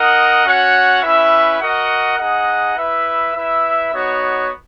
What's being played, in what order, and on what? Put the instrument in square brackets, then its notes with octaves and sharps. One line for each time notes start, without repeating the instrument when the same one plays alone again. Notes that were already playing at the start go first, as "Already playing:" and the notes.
Already playing: [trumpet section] D#4 A#4 D#5 F#5
C#4 F#4 C#5 F#5
C#4 E4 B4 E5
F#4 A#4 D#5 F#5
D#4 G#4 D#5 F#5
E4 B4 E5
E4 B4 E5
B3 D#4 F#4 C#5